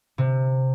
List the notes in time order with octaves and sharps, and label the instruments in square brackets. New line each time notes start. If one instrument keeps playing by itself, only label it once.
[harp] C3